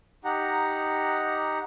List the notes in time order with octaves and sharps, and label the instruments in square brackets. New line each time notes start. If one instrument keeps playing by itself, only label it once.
[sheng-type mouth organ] D#4 G4 F#5 A#5